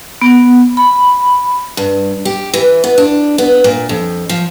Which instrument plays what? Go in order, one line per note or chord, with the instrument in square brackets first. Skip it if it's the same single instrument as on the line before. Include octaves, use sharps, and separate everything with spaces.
[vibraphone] B3
B5
[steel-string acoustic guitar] G2
G4
E3
B3
D4
B3
A#2
F2
F3